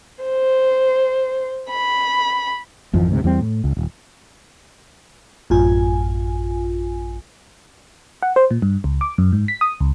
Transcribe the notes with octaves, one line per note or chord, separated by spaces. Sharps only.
C5
B5
G#1 F2 E3 F3
D2 G#2 C3
E2 G3 C4
A2
C#2
D#1
A1 F#2 F4 G#5
F#5
C5
A#2
G2
C#2
D6
F#2
G#2
B6
D#6
C#2